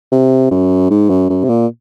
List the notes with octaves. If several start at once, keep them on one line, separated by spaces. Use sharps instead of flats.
C3
F#2
G#2
F#2
F#2
C3
A#2